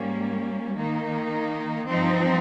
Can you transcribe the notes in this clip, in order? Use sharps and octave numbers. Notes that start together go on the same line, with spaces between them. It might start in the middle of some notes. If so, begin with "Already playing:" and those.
Already playing: G#2 G3 A#3 C#4
D#3 A#3 D#4
G2 F3 C4 D#4